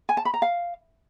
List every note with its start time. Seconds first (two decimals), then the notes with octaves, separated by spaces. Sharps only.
0.09 G#5
0.17 A5
0.25 B5
0.34 A#5
0.42 F5